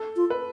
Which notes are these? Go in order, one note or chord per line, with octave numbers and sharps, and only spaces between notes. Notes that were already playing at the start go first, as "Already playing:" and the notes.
Already playing: A4
F4
B4